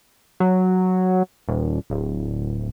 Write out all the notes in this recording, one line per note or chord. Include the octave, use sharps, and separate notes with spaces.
F#3
D#1
D1